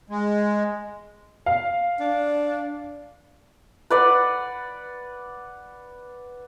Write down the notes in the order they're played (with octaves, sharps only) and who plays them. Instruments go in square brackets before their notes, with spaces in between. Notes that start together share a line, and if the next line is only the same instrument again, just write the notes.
[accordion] G#3
[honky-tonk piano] F5
[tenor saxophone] D4
[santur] B4 D5 F#5